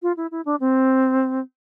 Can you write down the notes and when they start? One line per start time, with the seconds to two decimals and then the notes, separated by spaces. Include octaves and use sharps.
0.02 F4
0.17 E4
0.31 E4
0.45 D4
0.60 C4